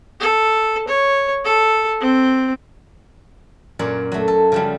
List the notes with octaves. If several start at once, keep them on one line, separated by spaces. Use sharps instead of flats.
A4
C#5
A4
C4
F#2 A#2 C#5 D5
F#3 A3
A4
C#3 F3 G3